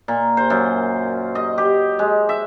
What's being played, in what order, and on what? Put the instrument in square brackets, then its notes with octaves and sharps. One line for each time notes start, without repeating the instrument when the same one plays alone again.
[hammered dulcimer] A#2
C5
F#2
D#5
G4
G#3
E5